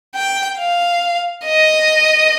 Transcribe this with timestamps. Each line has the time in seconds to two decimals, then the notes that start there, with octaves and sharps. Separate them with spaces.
0.15 G5
0.58 F5
1.45 D#5